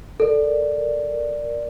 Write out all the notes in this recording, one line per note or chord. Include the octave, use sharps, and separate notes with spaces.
A4 A#4 D5